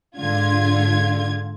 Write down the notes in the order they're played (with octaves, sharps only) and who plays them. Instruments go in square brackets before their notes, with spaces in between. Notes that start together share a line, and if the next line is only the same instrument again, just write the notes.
[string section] G#2 D3 F4 G#6